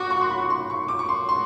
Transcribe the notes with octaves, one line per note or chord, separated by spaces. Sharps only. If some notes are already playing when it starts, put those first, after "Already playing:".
Already playing: F#4 D6
C#6
C6
B5
C#6
C6
C#6
F#4 D6
C#6
C6
C6